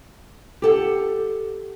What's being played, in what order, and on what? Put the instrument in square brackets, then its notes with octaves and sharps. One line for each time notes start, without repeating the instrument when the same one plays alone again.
[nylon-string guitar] G4 A4 F#5